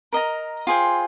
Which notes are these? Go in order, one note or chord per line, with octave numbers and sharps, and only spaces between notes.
A#4 D#5 A#5
F4 G#4 C5 G5